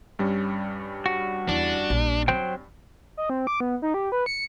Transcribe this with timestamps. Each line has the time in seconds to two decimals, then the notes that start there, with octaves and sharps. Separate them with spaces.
0.19 G2 G3 C#4
1.06 F#4
1.49 E2 D4
1.90 A#1
2.28 F#3 C4 C5 G5
3.17 D#5
3.30 C4
3.47 D6
3.60 B3
3.82 D#4
3.94 G4
4.12 B4
4.26 C#7